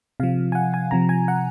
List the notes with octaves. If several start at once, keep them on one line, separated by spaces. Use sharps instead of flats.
C3 F3 F5
G#5
F#5
G#5
C3 F3 A#5
G#5
F#5